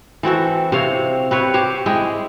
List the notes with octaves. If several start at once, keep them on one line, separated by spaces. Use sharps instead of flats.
E3 C4 F#4 A4
C3 C4 C#5 F5
C4 B4 C#5
G4 C5 C#5
G#3 E4 G5